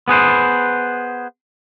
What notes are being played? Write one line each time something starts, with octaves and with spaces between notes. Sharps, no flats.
B3 G#4 B4 C5